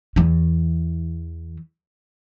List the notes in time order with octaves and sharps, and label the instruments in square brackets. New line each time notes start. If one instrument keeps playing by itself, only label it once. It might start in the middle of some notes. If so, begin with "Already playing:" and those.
[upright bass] E2 E3